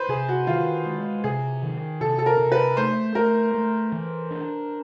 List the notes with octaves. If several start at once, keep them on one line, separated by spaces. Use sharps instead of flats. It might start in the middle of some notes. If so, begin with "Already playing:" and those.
Already playing: B4 C5
C3 G#4
F#4
D#3 F4
G#3
C3 G#4
D#3
C3 A4
A4
A#4
C3
B4
A3 C5
A3 A#4
A3
E3
D4